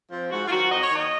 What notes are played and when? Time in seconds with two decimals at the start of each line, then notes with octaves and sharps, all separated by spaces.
0.11 F3 C4
0.31 G#2 F#4
0.47 F4
0.51 D#3 F#3 C4 F#4
0.70 F2 D#5
0.82 C#5
0.90 D#3 A#3 D#5